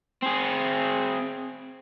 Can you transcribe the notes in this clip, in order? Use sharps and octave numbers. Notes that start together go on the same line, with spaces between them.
C4 G#4